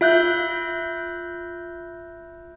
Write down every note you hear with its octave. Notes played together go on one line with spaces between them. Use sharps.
F4 E5 F#6 G6